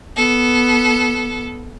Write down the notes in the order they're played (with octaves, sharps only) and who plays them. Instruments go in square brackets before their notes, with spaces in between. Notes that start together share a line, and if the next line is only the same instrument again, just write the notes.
[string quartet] B3 A4